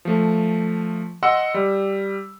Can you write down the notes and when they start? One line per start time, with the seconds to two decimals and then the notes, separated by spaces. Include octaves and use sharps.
0.05 F3 A3
1.23 D#5 F#5 C6 E6
1.54 G3